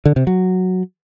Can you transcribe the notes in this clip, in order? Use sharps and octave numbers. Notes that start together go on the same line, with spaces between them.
D3
C3
F#3